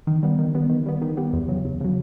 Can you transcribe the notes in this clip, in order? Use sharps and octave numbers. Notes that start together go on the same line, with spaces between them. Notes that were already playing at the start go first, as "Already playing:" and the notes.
D#3
G3 B3
D#3
G3 B3
D#3
G3 B3
D#3
G3 B3
E2
C#3 F#3
E2
C#3 F#3